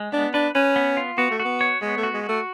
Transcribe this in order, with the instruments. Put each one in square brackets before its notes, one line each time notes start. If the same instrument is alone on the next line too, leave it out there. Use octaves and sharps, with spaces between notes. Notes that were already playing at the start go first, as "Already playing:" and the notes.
Already playing: [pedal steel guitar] G#3
[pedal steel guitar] B3 [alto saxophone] D4
[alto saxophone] D4 [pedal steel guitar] B4
[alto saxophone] C#4 [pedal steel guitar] B4
[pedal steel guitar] B3
F4
[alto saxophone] B3 [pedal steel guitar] F#4
[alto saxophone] A3
[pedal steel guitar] F#4
[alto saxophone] B3
[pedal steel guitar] C#5
[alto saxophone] G#3 [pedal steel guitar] B3
[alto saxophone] A3
[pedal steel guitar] F#4
[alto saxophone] G#3
[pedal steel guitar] F#4
[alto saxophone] A3